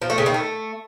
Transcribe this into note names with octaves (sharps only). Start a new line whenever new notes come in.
F3
A3
C#3
D#3
A3